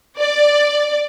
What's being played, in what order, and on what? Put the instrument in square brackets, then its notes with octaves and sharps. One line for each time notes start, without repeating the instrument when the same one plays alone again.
[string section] D5